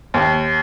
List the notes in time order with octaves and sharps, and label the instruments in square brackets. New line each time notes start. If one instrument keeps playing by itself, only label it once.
[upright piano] D#2